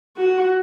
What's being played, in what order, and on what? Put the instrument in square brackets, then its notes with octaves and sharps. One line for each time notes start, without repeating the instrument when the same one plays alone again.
[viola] F#4